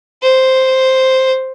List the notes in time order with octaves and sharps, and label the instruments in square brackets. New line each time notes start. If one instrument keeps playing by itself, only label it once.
[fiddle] C5